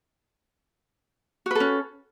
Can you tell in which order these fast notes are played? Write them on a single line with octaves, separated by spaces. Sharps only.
F#4 B4 A4 C#4